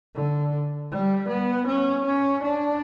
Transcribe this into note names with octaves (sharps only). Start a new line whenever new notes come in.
D3
G3
B3
C#4
C#4
D4